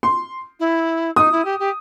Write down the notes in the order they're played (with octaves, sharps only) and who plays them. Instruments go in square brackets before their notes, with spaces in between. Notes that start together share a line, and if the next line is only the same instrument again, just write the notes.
[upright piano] C6
[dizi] E4
[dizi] D#4 [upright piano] D#6
[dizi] E4
G4
G4